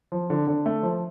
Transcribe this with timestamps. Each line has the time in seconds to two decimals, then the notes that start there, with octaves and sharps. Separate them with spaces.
0.12 F3
0.30 D3
0.47 D3
0.66 A3
0.83 F3